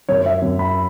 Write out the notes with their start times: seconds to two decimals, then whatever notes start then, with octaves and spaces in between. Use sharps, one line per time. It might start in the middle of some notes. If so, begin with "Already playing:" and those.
0.09 F#2 C#5
0.26 E5
0.42 F#2
0.59 B5